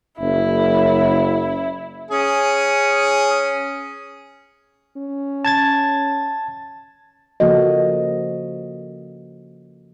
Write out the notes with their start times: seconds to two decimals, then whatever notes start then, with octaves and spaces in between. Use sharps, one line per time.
0.19 F#1 E4
2.11 C#4 G#4
4.97 C#4
5.45 A5 G#6 A6
7.40 C#3 F3 A#3 F#4 A4 D#5